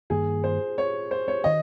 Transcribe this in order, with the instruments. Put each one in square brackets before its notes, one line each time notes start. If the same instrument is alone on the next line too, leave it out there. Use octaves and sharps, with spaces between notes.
[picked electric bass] G2 D#3 A#3 [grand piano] G#4
[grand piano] C5
C#5
C5
C#5
[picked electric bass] D#3 [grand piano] D#5